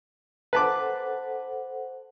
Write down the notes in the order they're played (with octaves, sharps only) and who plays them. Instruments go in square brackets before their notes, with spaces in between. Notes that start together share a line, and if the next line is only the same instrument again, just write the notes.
[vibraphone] A4 C5 F#5 [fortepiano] B4 A5 D6